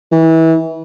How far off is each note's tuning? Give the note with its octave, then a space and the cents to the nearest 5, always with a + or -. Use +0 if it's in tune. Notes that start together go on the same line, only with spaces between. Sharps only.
E3 -25